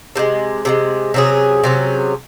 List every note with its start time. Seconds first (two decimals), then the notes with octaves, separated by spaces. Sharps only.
0.16 C3 F3 G#3
0.65 C3 F3 G#3
1.14 C3 F#3 C#4 G#4
1.64 C3 F#3 C#4 G#4